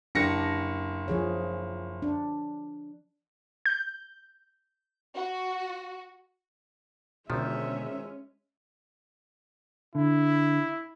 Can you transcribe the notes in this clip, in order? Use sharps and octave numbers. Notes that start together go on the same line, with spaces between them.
F#1 D4 G4 A#6 C#7
F3 G#4 C#5
D4
G6
F#4
G#1 B2 D3 D#3 F3 G#3 C#4 E5
D3 E4